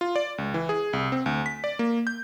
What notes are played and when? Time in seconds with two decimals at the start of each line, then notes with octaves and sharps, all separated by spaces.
0.01 F4
0.16 D5
0.38 C#2
0.54 E3
0.69 G#4
0.93 C2
1.12 C4
1.26 D2
1.46 B6
1.64 D5
1.79 A#3
2.07 G6